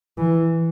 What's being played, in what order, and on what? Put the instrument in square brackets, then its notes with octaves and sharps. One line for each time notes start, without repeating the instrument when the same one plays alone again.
[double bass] E3